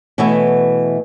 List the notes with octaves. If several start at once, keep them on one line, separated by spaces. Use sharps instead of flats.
B2 E3 A3 B3 C#5 E5